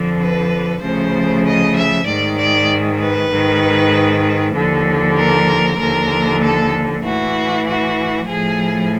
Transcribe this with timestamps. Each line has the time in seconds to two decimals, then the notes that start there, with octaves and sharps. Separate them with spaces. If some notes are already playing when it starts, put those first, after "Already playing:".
Already playing: F2 D3 F3
0.20 B4
0.81 D2 C#3 F3 C5
1.44 D#5
1.74 E5
2.05 G#2 D#3 D5
2.37 D5
2.99 B4
3.30 G#2 D#3
4.54 D#2 D3 F3
5.17 A#4
5.78 D#2 D3 F3 A#4
6.41 A4
7.03 A2 E3 F#4
7.65 F#4
8.27 A2 F3 G#4